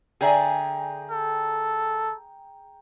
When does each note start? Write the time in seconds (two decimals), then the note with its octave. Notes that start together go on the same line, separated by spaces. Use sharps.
0.21 D3 G#4 D5 E5 G5 A#5
1.11 A4